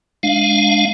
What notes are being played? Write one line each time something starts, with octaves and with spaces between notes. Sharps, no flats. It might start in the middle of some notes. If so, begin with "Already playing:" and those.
G#3 D4 F5